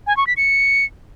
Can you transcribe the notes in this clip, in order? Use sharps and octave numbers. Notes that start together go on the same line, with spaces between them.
G#5
C#6
B6
C#7